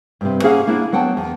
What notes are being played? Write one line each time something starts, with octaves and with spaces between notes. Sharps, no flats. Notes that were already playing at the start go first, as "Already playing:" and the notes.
G2 C3
A#3 C#4 G#4 F5 F#5
A#3 D4 E4
F#3 B3 F#5 G5 A5
E2